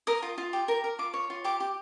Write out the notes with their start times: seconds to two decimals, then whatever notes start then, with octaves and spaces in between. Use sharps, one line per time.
0.07 A#4 D#6
0.22 F4
0.38 F4
0.53 G4
0.68 A#4
0.84 A#4
0.99 F4 D6
1.14 C#5
1.30 F4
1.44 G4 D6
1.60 G4